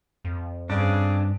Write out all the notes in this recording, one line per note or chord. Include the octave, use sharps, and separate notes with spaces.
F2
G2 C#3 C4 D4 G#4